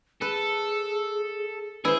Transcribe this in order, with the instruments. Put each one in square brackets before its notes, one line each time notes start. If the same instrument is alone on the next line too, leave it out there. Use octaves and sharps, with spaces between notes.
[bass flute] G#4 [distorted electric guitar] A4 [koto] B4
[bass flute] D#3 [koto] E4 C5 [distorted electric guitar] G#4 [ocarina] B4